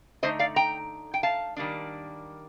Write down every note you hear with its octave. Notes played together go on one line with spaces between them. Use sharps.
D3 A3 D#4 C5 D#5
D5 F5
G5 A#5
G5
F5 A5
D#3 G3 A#3 D4